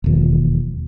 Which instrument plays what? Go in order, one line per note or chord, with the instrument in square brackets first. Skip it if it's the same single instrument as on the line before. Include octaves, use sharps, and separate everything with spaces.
[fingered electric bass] E1 D#2 F3